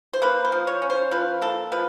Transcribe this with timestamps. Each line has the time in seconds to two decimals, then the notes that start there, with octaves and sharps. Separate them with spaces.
0.13 C5
0.22 A#3 B4
0.45 C5
0.52 F3
0.67 C#5
0.82 C#4
0.90 C5
1.11 F3 B4
1.41 A#3 A4
1.72 F3 B4